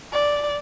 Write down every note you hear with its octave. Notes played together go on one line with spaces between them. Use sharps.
D5